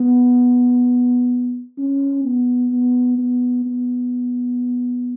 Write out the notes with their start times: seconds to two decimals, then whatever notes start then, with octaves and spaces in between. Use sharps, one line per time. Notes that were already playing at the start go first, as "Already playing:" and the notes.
Already playing: B3
1.78 C#4
2.24 B3
2.72 B3
3.18 B3
3.66 B3